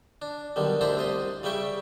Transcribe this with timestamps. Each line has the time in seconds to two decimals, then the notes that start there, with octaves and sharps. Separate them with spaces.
0.22 D4
0.56 B1 D3 D#3 G3
0.81 D2 D4 E4 C5 A#5 B5
0.97 C2 D#5 C6
1.43 C#3 G3 E5 G5 C#6